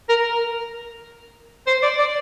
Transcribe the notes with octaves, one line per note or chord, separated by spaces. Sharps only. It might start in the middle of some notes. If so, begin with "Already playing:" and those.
A#4
C5
D5
D5